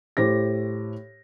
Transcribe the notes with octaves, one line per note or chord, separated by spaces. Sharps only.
A2 G4 C5 A#6